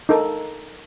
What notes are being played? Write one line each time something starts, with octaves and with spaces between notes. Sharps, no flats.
D#4 A4 A#4